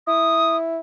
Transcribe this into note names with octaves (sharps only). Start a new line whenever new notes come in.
E4 D#6